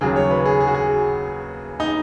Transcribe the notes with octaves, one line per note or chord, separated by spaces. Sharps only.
D#2 C#3 F#3 G#4
C#5
B4
G#4
G#4
F#4
G#4
D#4